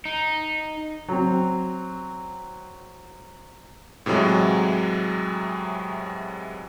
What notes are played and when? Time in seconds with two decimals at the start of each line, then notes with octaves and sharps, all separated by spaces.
0.05 D#4
1.09 F#3 C4
4.06 A2 C3 E3 F#3 G#3